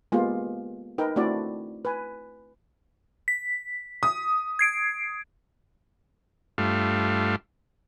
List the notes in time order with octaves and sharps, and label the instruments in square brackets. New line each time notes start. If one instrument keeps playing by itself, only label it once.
[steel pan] G#3 A#3 B3 F4 G4
D#4 A#4 B4 G5
A3 C4 D4 E4 F#4 D5
B4 G#5
[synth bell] B6
[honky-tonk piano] D#6
[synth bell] G#6 C7 D7
[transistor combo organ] G2 A3 F4